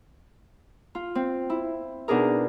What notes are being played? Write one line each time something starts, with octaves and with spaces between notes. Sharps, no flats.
F4
C4
E4
B2 D4 D#4 G#4 A#4